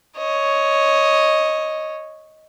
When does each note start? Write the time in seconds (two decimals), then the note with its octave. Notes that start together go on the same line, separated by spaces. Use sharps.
0.17 C#5 D#5